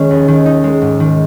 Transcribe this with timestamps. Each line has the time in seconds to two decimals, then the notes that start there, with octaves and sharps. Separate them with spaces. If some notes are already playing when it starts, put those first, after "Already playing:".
Already playing: D#3 G#3 C#4
0.11 D#2
0.28 D#3
0.46 D#4
0.64 G#3
0.82 G#2
1.00 D#3